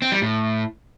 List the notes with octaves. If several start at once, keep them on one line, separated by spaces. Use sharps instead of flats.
C4
G3
A2